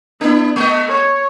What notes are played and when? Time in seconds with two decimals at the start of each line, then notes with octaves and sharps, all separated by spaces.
0.21 B3 D4 E4
0.56 G#3 D#5
0.87 C#5